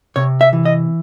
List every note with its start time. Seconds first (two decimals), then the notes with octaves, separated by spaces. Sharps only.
0.16 C3 C#5
0.41 E5
0.53 E3
0.65 D#5